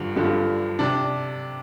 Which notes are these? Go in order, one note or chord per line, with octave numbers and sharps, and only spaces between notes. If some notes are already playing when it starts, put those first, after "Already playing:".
Already playing: G2 D3 F3
G2 D3 F3
C3 D4